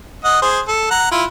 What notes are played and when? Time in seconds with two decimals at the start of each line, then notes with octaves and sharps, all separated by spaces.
0.24 D#5 F#5
0.42 G#4 C5
0.68 A4
0.91 F#5 A#5
1.11 E4 F4